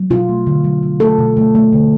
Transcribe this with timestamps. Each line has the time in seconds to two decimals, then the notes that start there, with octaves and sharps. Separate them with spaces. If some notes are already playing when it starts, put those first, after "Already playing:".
Already playing: F#3
0.10 B2 F4
0.29 A3
0.47 D3
0.64 F#3
0.83 D3
1.00 A3 A4
1.19 B2
1.37 A3
1.55 A3
1.73 D3